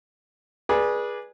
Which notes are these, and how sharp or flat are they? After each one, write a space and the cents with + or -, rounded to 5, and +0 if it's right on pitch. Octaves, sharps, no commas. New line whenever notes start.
G#4 +0 B4 -25 D5 +0